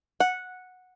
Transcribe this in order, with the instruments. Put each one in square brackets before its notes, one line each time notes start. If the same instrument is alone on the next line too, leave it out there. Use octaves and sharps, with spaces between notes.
[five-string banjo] F#5